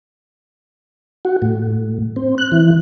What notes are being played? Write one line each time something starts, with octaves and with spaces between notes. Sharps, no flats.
F#4
A2
C4
F#6
E3